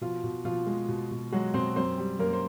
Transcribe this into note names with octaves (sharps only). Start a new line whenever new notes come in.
B2 F3 F4
B2
B2 F3 F4
G#3
B2
B2
F#3 G#3 F#4
B2 C4 C5
F#2 C4 C5
G3
F#2 A#3 A#4
C5